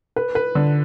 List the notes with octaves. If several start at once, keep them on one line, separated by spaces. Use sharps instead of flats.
B4
B4
D3